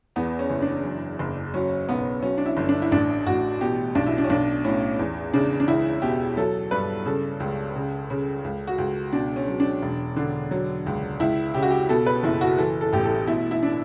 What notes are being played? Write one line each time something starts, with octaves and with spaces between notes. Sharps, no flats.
E2 B3
C#4
F#1
D4
F#2
F#1
F#3 C#4
B1 B3
F#3 C#4
D4
E4
G1
D4
E4
A1 D4
A1 F#4
B2 G4
B1 D4
E4
D4
C#4
B1 D4
A2 C#4
E2
C#3 D4
D4
C#2 E4
B2 G4
F#3 A4
G2 B4
C#3 A4
C#2
C#3
C#3
C#2
F#4
C#2
B2 D4
C#4
F#3
D4
E1
D3
F#3
C#2
C#2 E4
C#3 G4
F#4
G4
B2 A4
B4
F#1 E4
F#4
E3 A4
A4
A1 G4
A4
B2 E4
E4
D4